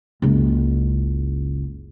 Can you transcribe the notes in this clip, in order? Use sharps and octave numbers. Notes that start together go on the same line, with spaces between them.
F#1 C#2